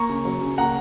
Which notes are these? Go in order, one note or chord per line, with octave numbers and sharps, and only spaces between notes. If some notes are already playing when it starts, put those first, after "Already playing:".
Already playing: A#3 A#5 C#6
C#3
F#3
C#3
A#3 F#5 A#5